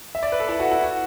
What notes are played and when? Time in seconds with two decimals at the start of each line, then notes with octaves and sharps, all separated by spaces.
0.15 E5
0.23 D5
0.32 B4
0.40 A4
0.49 E4
0.59 F#4
0.72 E4
0.82 F#4